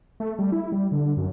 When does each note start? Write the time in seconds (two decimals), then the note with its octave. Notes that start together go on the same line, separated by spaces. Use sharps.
0.20 A3
0.39 G3
0.52 E4
0.72 G3
0.92 D3
1.17 F#2